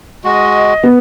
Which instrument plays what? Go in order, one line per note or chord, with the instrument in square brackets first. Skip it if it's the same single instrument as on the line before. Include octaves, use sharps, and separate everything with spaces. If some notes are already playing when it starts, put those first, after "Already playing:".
[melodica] G#3 F#4 [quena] D#5
[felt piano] B3